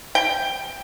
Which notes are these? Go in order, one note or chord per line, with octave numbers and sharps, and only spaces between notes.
G5